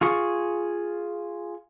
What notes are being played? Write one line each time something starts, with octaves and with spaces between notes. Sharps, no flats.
F4 G#4 C#6